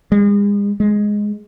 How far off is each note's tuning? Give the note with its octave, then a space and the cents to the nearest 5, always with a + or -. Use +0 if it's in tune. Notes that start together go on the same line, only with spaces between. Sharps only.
G#3 -40
G#3 +0